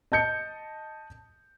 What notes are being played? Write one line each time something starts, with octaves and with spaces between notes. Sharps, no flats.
D#5 A5 G6 C#7